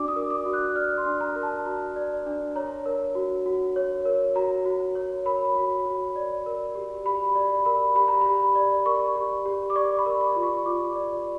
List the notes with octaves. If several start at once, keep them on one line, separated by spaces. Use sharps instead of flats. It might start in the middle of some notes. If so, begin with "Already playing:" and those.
Already playing: D4 F#4 D5 D6
D#6
A#4
D6
F#4
F#6
D5 F6
C6
D4
A#5
A#4
A5
F#4 A#5
D5
D4
C#5 A#5
A#4
F#4
F#4
C#5
A#4
F#4 A#5
F#4
C#5
A#4 B5
F#4
F#4
D5
A#4
G4
G4 B5
D5 B5
A#4 B5
G4 B5
A#5
G4 B5
D5
A#4 C#6
G4
G4
D6
D5 C#6
B5
A#4
C#6
F4
C#6
F4 D6
D5